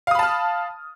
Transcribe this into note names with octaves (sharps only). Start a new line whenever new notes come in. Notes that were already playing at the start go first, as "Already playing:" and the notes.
F5 A5 B5 D#6 F6